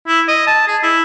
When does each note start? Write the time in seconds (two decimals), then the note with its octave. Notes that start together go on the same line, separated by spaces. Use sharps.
0.08 E4
0.28 D#5
0.47 A5
0.68 G#4
0.83 E4